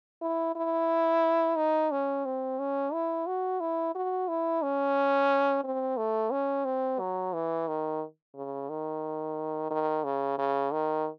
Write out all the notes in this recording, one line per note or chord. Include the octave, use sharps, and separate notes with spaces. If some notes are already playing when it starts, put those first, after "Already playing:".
E4
E4
D#4
C#4
C4
C#4
E4
F#4
E4
F#4
E4
C#4
C4
A3
C#4
C4
F#3
E3
D#3
C#3
D#3
D#3
C#3
C#3
D#3